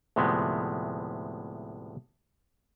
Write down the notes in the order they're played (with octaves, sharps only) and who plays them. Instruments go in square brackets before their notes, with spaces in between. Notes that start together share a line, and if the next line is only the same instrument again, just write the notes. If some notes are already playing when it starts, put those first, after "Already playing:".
[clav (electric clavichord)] D2 A2 C3 F3 G#3 B3